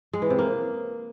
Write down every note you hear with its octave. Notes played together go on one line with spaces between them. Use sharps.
G#3
E3
C3
A#3